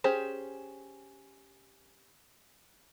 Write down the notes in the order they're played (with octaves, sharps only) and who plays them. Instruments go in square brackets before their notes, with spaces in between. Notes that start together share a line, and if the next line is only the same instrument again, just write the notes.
[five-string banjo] C#4 G4 G#4 C5